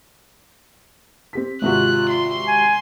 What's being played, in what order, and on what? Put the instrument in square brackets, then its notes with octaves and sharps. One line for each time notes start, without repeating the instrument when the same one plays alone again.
[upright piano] C4 G4 B6
[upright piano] G#1 C3 F#4 [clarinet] F4 [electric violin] F#6
[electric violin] C6
[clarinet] G#5